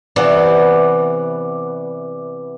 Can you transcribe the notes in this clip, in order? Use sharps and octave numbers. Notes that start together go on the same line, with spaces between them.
C3 E3 B3 D5 F#5